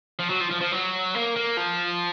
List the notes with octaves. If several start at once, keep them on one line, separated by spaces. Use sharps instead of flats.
F3
F#3
F3
F3
F3
F#3
A#3
A#3
F3